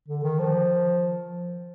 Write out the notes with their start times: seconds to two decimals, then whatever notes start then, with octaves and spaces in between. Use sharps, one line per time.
0.09 D3
0.23 D#3
0.39 F3